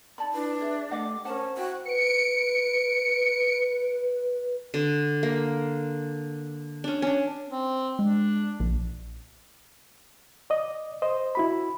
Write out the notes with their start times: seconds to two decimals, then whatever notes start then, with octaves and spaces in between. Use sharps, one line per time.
0.18 D#4 D5 A5 B5
0.33 D4 E4 B4
0.61 G#4 E5
0.91 A3 G4 D#5 F#5 D6
1.25 C#4 A#4 C5 F#5 A5
1.57 E4 F#4 G5
1.86 B4 C#7 D7
4.74 D3
5.23 A#3
6.84 C#4 D4
7.02 C#4 D4
7.51 C4
7.99 G#3 D4
8.60 A#1
10.50 D5 D#5
11.02 C5 D#5
11.35 E4 F#4 B5